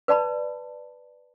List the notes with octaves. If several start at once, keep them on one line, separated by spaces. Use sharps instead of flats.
B4 D5 A5 B5